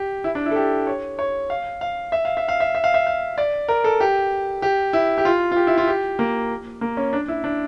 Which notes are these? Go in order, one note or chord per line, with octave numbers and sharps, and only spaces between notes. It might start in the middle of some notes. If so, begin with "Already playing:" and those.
Already playing: G4
E4
D4
E4
A4
G4
C#5
C#5
F5
F5
E5
F5
E5
F5
E5
E5
F5
E5
F5
D5
A#4
A4
G4
G4
E4
G4
F4
F4
G4
E4
F4
G4
A#3
A#3
C#4
D4
E4
D4